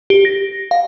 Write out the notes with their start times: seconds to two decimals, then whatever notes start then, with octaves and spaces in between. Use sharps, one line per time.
0.10 G4
0.25 A#6
0.71 F5